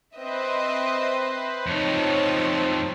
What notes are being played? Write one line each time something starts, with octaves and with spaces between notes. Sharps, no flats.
C4 B4 C5 D#5 E5
F2 F3 C4 D#4 C#5 A5